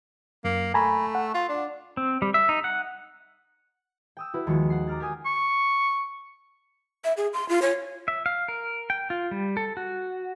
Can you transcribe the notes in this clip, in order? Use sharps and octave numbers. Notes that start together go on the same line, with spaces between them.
F#2 A#3
A3 G#5 A#5 B5
F#5
F4
D4
C4
G3
E5
D#4
F#5
G5 D#6 E6
E4 F#4 B4
D#2 F3 G#3 F#4 C#6
F#5 C7
A#5 D6 F6 A6
G4 A#4 G#5 D#6
C#6
E5
G#4
C6
F4
C#5
E5
F5
A#4
G5
F4
G3
A4
F#4